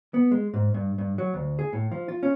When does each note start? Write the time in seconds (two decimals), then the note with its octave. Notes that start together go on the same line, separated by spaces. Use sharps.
0.14 B3
0.31 G#3
0.54 G#2
0.74 G2
0.98 G2
1.18 F#3
1.34 D2
1.59 G#4
1.73 A2
1.92 F3
2.08 F4
2.23 C#4